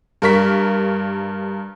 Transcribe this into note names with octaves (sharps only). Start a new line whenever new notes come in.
G2 A#4 C#6 B6